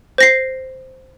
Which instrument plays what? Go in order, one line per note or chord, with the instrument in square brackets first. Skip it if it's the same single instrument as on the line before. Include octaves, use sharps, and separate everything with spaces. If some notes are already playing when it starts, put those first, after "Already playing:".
[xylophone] C5 A#6 C7